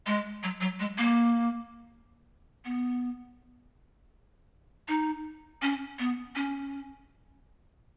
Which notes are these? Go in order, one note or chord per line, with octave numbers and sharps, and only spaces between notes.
G#3
F#3
F#3
G#3
A#3
B3
D#4
C#4
B3
C#4